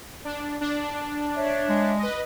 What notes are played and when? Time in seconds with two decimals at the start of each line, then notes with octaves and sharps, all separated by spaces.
0.25 D4
0.61 D4
1.35 C#5 E5
1.69 G#3
1.99 B4 D#5